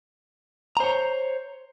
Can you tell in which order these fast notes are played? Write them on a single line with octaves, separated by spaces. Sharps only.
A#5 C5 C#5